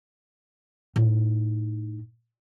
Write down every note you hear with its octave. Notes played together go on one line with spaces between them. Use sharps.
A2 D#4